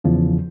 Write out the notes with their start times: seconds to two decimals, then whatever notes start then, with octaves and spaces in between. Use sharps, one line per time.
0.04 E2 C#3 F3